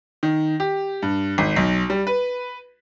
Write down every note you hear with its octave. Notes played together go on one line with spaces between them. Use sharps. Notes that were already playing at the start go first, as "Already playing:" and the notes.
D#3
G4
G2
G#1
B1
G3
B4